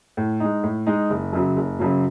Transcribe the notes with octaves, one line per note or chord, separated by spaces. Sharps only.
A2
G#3 D#4
A2
G#3 D#4
F#1
F#2 C#3 F#3
F#1
F#2 C#3 F#3